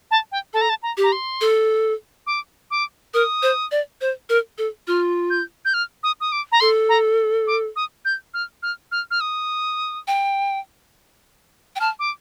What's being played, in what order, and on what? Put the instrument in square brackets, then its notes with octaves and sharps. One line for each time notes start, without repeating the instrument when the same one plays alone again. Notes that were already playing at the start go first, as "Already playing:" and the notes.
[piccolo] A5
G5
[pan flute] A4 [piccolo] A5
[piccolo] A#5
A5
A#5
[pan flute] G4
[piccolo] A#5
C6
[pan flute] A4
[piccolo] D6
D6
[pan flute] A#4 [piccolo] D#6
[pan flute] C5
D5
C5
A#4
A4
[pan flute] F4 [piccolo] F6
[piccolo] G6
G6
F6
D#6
D#6
D6
A#5
[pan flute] A4 [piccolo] C6
[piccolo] A#5
D6
D#6
G6
F6
F6
F6
F6
D#6
[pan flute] G5
G5
[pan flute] A5 [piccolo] F6
[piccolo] D6